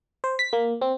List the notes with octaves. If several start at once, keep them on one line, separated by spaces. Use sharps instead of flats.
C5
B6
A#3
C4